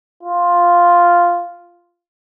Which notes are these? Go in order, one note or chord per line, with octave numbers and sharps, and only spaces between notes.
F4